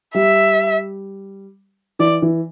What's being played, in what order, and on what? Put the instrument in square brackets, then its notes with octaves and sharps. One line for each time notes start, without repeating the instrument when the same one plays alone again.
[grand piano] G3 [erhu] E5
[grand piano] E3 [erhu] D5
[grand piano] E3